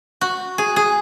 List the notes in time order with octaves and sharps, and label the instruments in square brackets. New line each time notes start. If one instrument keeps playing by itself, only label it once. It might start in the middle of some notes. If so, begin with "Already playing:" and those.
[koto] F#4
G#4
G#4